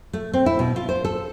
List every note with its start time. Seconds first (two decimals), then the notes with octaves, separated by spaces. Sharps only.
0.13 A3
0.34 C4
0.46 E4
0.59 B2
0.76 F4
0.89 C5
1.05 A4